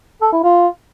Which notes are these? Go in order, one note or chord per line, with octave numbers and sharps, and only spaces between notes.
A4
E4
F4